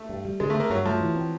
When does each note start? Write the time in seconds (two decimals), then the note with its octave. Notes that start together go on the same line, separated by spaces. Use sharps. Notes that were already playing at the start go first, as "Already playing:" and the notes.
Already playing: A3
0.09 G2
0.25 G3
0.40 D3 G#3
0.50 A3
0.55 A#3 C4
0.70 G2 F#3
0.85 F3 A3
1.01 E3
1.15 C4